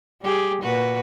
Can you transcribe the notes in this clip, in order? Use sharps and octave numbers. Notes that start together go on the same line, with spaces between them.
G3 G4 G#4
A#2 F#4 B4